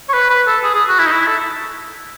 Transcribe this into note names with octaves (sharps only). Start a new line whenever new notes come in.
C#5
B4
B4
A4
G#4
G#4
F#4
E4
D#4
E4
A4